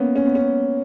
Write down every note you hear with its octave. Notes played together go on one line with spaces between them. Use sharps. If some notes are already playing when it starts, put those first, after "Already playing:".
Already playing: A#3 B3 C#4
C#4
B3
C#4